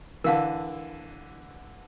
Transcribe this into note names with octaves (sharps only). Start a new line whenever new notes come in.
D3 E3 A#4 F5 A5